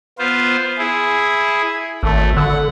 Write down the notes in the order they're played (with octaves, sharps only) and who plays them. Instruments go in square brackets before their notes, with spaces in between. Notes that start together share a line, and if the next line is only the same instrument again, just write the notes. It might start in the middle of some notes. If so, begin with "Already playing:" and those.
[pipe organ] B3 F4 C5
E4 G#4
[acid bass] G#1 [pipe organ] A3
[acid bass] D3 [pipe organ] F#5